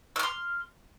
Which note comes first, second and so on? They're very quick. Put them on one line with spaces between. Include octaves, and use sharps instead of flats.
E6 F6 C6